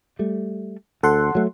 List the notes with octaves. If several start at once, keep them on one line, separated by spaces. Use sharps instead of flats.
G3 A3
D2 A4 F#5 C6
F#3 A3